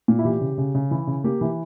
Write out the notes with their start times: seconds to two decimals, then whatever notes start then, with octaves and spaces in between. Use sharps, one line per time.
0.08 A#2
0.19 E4
0.25 E3 G4
0.41 C#3
0.58 C#3
0.75 C#3
0.91 E3 E4
1.07 C#3
1.24 A#3 G4
1.41 E3